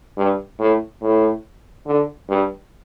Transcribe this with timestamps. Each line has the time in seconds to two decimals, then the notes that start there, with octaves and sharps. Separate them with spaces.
0.18 G2
0.60 A2
1.02 A2
1.87 D3
2.29 G2